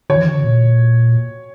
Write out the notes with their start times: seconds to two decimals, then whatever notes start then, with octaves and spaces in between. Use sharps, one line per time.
0.10 D3 C#5
0.16 E3
0.24 D3
0.38 C#3
0.44 A#2